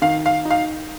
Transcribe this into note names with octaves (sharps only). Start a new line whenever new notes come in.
D#3 F5
F5
D#4
F5